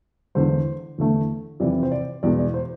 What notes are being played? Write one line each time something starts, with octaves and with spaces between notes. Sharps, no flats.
E2 D3 G#3 C5
E2 D3 A3
F2 C3 E3 D5
C5
D5
E2 B2 G#3 D5
D5
C5